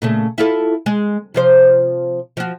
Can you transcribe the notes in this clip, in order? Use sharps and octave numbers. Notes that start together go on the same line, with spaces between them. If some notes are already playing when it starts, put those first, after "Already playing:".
A#2 C#3 A3
E4 F4 A4
G#3
C3 F3 C5
F3 F#4